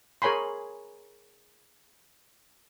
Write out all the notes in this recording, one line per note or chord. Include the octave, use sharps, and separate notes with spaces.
G#4 A#4 C#5 G#5 B5 C6